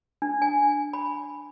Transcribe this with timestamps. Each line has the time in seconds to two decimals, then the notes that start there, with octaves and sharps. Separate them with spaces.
0.22 D4
0.42 G#5
0.93 B5